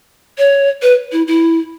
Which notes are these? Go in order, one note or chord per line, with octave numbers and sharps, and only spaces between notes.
C#5
B4
E4
E4